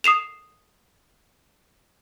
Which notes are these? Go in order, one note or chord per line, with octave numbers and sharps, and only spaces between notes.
D#6 C7 E7 F7